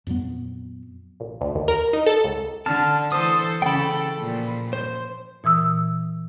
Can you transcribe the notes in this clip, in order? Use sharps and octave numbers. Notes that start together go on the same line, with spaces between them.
F2 A#2 F#3 B3
A#1
D2
D#2
A#4
D#4
A4
C#2
D3 A5 F6
E3 A4 C5 D#6
C#3 A4 G5 B5
A#2 F3
C5
A#2 E3 D#6 E6